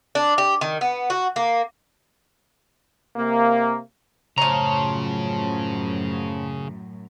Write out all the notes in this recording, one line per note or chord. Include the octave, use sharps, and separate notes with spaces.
D4
G4
D#3
B3
F#4
A#3
C3 A#3
F#2 A2 C#3 F3 C#5 A#5